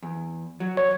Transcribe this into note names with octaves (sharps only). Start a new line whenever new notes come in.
E2
F#3
C#5